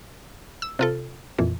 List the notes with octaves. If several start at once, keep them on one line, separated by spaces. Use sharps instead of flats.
E6
C3 F4 A4
F2 A#2 E3